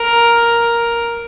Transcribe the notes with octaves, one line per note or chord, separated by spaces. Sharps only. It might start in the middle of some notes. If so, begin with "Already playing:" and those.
Already playing: A#4